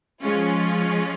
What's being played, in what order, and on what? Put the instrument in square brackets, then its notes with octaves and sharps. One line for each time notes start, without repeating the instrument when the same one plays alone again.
[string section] F3 G#3 C#4 F4